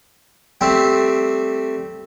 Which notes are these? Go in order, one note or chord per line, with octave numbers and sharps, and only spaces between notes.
G3 A3 C4